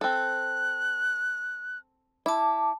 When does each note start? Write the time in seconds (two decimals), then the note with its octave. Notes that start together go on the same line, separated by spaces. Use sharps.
0.01 C4 A4 F#6
2.26 E4 A5 D6